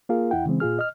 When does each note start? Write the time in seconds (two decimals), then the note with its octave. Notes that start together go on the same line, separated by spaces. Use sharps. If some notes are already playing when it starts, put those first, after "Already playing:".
0.09 A#3 F4 G#4 A#4 F5
0.31 E2 E4 F#5 G5
0.46 C#3 E3 G#3 C4
0.60 A#2 F4 G#4 F6
0.79 D#5 F6